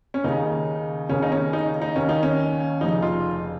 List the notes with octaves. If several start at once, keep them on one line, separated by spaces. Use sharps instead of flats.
C#4
D#2 C#3 D#4
D#2 C#3 C#4
D#4
C#4
D#4
D#4
D#2 D#3 C#4
D#4
C#4
F1 F2 C#3 D#4
F4